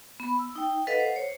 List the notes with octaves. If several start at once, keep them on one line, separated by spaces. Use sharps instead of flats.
B3 B5
E6
D#4 G5
A4 B4 D#5 F5 F#5
C5
C5 C#5